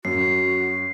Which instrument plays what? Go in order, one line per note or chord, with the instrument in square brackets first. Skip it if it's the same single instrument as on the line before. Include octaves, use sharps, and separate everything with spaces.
[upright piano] F#2 [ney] F#4 [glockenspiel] C7